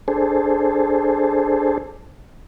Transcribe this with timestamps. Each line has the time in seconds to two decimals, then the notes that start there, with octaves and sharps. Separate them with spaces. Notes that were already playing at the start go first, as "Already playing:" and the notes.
0.08 D4 G#4 A4 C5